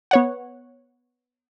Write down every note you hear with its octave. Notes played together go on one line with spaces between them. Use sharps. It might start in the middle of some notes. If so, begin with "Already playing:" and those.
B3 C#5 F#5